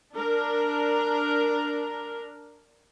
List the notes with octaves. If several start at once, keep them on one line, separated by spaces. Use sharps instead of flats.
D4 A#4